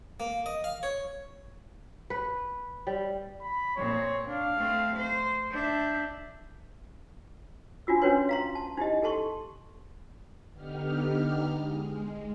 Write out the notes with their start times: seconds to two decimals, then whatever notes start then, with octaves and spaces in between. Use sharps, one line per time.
0.20 A#3
0.46 D#5
0.64 F5
0.83 C#5
2.10 B4
2.87 G3
3.42 B5
3.77 A#2 C4 C#5
4.27 D4 F5
4.57 A3 C4
4.96 C5
5.51 D4 E5 G6
7.87 D4 F4 F#4 E6
8.02 C#4 D4 F#4 B4 C#5 C6
8.29 F5 A#5 C6
8.55 A5
8.77 D#4 E4 G4 D#5
9.02 G4 A4 A5 C6 C#6
10.51 D3 B3 D#4 G4 F6
11.55 G#3